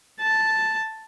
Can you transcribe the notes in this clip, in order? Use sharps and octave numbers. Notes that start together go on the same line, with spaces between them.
A5